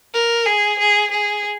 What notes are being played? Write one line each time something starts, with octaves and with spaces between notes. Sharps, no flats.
A#4
G#4
G#4
G#4